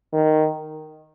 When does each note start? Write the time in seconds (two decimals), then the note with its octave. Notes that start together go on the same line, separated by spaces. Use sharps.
0.13 D#3